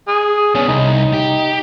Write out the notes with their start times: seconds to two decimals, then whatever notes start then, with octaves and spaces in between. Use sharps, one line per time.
0.08 G#4
0.55 B3 C#4 D4
0.68 C2 D#4
1.13 G4